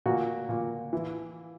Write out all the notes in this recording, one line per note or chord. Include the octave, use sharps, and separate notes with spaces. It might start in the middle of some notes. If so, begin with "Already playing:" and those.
A#2 F#4
A#2
E3